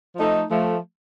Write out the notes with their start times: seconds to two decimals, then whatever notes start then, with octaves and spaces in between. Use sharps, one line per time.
0.16 F3 A3 D#4 A4
0.50 F3 A3